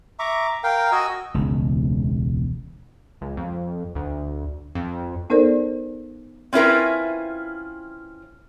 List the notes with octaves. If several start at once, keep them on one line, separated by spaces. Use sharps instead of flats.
E5 A#5 C#6 D6
A#4 F5 G5
F#4 D#5 G#5 E6
E1 C#2
C#2
F2
D2
F2
B3 D#4 A4 A#4 C5 D5
C4 C#4 E4 F4 A#4 B4